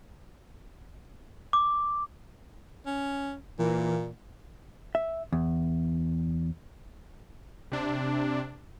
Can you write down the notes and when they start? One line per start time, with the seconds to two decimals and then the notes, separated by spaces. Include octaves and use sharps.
1.53 D6
2.86 C#4
3.59 A#2 E3 A#3
4.95 E5
5.33 E2
7.72 C3 D4